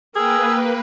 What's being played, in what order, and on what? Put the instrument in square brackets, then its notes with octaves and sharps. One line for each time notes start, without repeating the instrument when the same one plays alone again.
[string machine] A#3 B4 [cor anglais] G#4 [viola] A#4 G5 [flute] E6